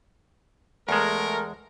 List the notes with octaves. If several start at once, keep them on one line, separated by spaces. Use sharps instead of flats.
E2 G#3 A3 A#4